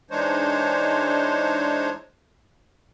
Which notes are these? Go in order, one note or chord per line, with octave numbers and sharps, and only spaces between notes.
E3 G#3 D4 D#4 C5 C#5